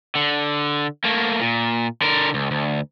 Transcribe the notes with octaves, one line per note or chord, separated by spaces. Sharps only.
D3
A3 A#3
A#2
D3 A#4
C#2
D2